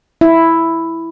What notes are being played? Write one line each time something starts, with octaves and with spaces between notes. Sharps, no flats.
E4